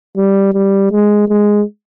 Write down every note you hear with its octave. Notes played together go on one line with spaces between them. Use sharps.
G3
G3
G#3
G#3